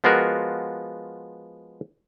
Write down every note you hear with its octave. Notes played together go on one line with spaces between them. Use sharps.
F3 G#3 B3 F4 F#4 A#4